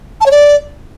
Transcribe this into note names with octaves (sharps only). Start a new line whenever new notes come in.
A5
C#5
D5